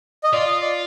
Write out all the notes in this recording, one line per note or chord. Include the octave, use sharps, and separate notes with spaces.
D#5
F4 D5
D#5
D5